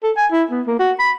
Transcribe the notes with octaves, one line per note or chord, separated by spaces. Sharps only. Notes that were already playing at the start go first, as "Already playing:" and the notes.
A4
G#5
E4
B3
A#3
F#4
B5